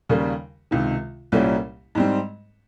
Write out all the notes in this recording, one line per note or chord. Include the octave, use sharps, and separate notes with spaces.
D#2 C#3 G3 A#3
C#2 C3 D#3
C2 A#2 G3 A#3 C#4
G#2 G3 C4